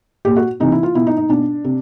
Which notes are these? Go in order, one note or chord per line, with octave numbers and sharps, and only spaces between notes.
A#2 G4
F#4
C3 E3 D#4
E4
F4
B2 E4
D#4
D#4
B2 D4
C3